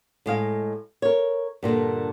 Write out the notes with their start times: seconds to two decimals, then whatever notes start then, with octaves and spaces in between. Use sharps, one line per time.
0.26 A2 G#3 F5
1.02 A#4 C#5
1.63 G2 A#2 D3